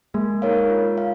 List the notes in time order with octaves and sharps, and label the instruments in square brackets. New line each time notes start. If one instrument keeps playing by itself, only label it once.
[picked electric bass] G#3 [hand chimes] A#3
[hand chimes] D#4 A#4 C#5 F5
F4
F5